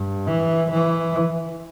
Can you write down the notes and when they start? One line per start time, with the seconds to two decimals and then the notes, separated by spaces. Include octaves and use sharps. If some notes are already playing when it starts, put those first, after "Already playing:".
Already playing: G2
0.27 E3
0.70 E3